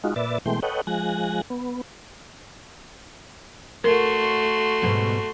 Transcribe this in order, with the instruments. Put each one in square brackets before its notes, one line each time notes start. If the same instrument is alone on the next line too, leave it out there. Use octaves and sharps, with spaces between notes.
[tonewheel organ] G#3 D#4 F4 F#4
A#2 B4 D5 E5 A6
B2 E3 G#3 A3 G5 C6
A4 B4 C#5 D#5 F#5 G5
F3 G#3 G#5 F#6 A#6
B3
[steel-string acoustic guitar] A2 [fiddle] A3 F#4 [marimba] A#4 [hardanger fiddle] C6
[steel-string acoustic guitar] G#2 B2 G3